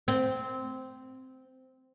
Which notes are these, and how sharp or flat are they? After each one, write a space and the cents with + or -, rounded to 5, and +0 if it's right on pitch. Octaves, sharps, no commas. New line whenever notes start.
C4 -10